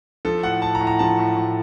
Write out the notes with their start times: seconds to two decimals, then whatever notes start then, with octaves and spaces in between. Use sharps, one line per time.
0.25 F3 A4
0.43 A2 F#5
0.62 A2 A5
0.75 A#5
0.81 A2
0.87 A#5
0.99 F3 A5
1.19 A2
1.36 A2